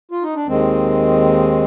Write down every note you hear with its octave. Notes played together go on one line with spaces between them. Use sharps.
F4
D#4
D4
D#2 D#3 G#3 C4